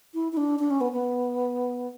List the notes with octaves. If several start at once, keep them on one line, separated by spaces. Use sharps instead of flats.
E4
E4
D4
D4
C#4
B3
B3